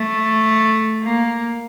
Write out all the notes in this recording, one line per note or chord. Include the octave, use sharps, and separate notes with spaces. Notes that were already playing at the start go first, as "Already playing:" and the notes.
Already playing: A3
A#3